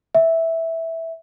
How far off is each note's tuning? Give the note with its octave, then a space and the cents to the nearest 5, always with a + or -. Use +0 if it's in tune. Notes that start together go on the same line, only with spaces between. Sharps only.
E5 -10